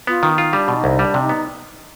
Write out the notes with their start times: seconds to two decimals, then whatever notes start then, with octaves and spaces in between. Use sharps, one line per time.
0.07 B3 F4
0.23 D#3
0.38 F4
0.52 G3 D4
0.68 B2
0.76 D#4
0.84 C2
0.98 G3 D4
1.14 C3
1.21 D#4
1.29 B3